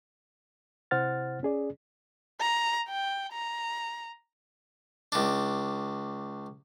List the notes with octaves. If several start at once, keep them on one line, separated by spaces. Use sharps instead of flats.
C3 E4 C5 F#5 F6 A6
C#4 G#4 D5
A#5
G5
A#5
C#2 D4